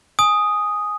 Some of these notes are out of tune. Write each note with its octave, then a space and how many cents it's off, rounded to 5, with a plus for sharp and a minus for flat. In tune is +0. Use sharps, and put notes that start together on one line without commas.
G#5 +0 D#6 +0